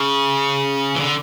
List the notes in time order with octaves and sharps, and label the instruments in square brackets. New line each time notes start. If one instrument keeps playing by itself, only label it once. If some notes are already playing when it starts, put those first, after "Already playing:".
Already playing: [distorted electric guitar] C#3
E3
D3